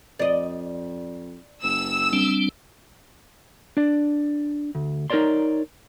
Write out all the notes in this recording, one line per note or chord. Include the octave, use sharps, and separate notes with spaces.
F2 D5 D#5
F#1 E6
G3 C4 D4
D4 D5
D2
D#4 A#4 B4 C#5 D5 C6